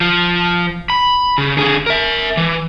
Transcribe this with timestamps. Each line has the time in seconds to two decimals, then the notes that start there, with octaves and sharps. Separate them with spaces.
0.01 F3
0.90 B5
1.38 C#3
1.57 D3 G#4
1.86 A#4 E5
2.37 E3